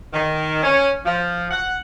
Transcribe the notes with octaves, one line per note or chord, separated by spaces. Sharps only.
D#3
C#4
F3
F#5